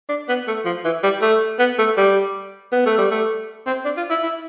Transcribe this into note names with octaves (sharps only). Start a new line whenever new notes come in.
D4
B3
A3
F3
E3
G3
A3
B3
A3
G3
B3
A3
G3
A3
C4
D4
F4
E4
E4